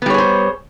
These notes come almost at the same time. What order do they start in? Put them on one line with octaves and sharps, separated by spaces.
B3 G3 C#5 G#4 C5